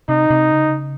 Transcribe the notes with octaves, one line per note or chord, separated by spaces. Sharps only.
C3 D#4
C3
C#3